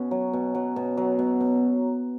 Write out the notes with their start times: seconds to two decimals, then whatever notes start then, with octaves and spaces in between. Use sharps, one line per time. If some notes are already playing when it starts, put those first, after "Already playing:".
Already playing: B2 B3 C#4
0.11 F#3
0.33 B2
0.55 F#3
0.76 B2
0.97 F#3
1.19 B2
1.41 B2